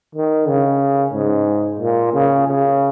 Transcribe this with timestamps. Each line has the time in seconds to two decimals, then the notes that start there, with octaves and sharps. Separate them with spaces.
0.15 D#3
0.48 C#3
1.14 G#2
1.80 A#2
2.13 C#3
2.47 C#3